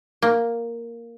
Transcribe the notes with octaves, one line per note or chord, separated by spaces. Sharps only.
A#3